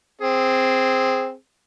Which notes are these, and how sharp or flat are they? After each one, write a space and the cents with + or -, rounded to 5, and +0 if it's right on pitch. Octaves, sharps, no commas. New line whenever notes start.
C4 +0 G#4 -5